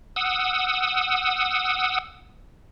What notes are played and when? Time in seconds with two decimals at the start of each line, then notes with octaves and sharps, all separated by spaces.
0.16 F#5 D#6 E6